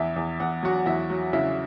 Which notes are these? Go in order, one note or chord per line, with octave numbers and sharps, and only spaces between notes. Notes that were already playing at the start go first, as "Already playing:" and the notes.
Already playing: E2 E4 E5
E2
E2 F#5
F#3 F#4 F#5
E2 E4 E5
F#3
C#3 E4 E5